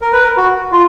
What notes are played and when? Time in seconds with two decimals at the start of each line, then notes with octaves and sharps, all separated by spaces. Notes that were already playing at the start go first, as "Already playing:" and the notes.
0.02 A#4
0.13 B4
0.23 A#4
0.37 F#4
0.72 F4